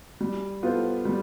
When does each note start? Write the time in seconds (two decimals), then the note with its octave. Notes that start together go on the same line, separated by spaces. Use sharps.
0.21 G3
0.63 B3 F4 A4 C5
1.05 G3